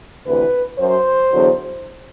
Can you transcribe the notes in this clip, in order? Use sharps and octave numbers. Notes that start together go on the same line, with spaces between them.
D2 C3 E3 B4
F#2 F#3 C5
E2 D3 F#3